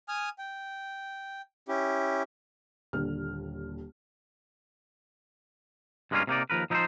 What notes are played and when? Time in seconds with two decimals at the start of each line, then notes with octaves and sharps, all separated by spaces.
0.08 G#5 D#6 F6
0.39 G5
1.68 C#4 E4 G4
2.93 D#1 D#2 D3 F6
6.11 G2 G#3 A#3 B3 C#4 F4
6.27 C3 A#3 D#4 D5
6.50 D#2 F3 A#4 B4
6.70 F3 D#4 E4 G4 A4 C5